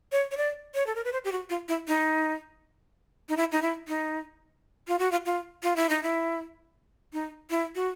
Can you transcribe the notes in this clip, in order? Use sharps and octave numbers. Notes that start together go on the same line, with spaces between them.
C#5
C#5
D5
C#5
A4
A#4
B4
C5
G4
F#4
F4
E4
D#4
D#4
E4
D#4
E4
D#4
F4
F#4
F4
F4
F4
E4
D#4
E4
D#4
E4
F#4